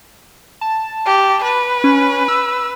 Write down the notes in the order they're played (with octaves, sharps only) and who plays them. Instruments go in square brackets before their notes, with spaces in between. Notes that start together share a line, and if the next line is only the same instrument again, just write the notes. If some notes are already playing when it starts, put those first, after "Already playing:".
[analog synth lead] A5
[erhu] G4
B4
[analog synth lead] C#4
E6